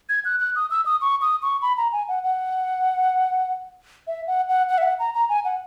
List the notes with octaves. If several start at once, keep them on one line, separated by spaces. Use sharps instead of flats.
G#6
F#6
F#6
D#6
E6
D#6
C#6
D#6
C#6
B5
A#5
G#5
F#5
F#5
E5
F#5
F#5
F#5
E5
F#5
A#5
A#5
G#5
F#5